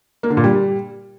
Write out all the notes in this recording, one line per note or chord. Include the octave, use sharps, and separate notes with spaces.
A#3
D3
A#2
G3